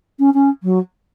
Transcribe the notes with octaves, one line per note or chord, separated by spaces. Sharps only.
C#4
C#4
F#3